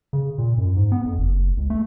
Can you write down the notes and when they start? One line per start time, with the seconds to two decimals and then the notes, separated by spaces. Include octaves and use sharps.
0.13 C#3
0.38 A#2
0.58 F#2
0.76 G#2
0.92 B3
1.05 F2
1.18 F#1
1.57 C#2
1.70 A3